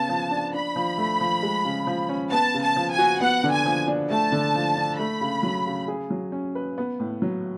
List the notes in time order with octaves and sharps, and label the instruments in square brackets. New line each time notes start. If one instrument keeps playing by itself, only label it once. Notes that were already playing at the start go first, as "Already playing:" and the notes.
Already playing: [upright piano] C#3 B3 [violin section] A5
[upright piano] F3
D4
[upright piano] D4 [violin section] B5
[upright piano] F3
A3
F3
G#3
C#3
F3
C#4
[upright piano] B3 [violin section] A5
[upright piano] C#3
[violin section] A5
[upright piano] F3
[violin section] G#5
[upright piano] F#4
[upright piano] B3 [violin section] F#5
[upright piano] D3
[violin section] G#5
[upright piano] F3
D4
[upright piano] A3 [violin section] A5
[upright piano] D3
F3
D4
[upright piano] A3 [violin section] B5
[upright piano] C#3
F#3
C#3
G#4
F#3
C#4
B4
B3
A2
F#3